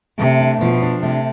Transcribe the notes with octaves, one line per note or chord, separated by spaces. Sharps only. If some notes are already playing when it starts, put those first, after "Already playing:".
C3 A3
D4
B2 F3
D4
C3 A3